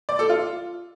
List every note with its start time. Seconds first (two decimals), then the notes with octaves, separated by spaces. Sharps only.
0.09 D5
0.19 A4
0.29 F4